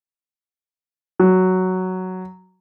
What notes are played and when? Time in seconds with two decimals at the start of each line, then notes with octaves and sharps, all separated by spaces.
1.19 F#3